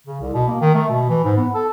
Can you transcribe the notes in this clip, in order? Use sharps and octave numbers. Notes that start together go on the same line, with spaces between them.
C#3
C2
B2
A#3
D#3
A3
B2
E3
G#2
B3
A4